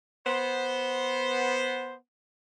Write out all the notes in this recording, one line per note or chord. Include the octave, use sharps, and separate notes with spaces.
B3 C5